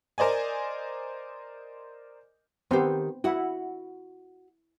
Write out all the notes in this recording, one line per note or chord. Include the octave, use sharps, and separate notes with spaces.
A#4 C5 D5 D#5 G#5
D#3 B3 C4 G4 C5
E4 F#4 F#5